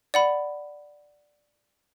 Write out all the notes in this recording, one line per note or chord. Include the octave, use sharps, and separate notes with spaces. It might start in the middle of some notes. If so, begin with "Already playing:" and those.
D5 F#5 B5